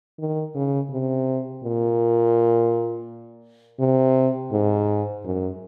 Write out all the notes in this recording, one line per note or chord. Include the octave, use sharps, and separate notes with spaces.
D#3
C#3
C3
A#2
C3
G#2
F#2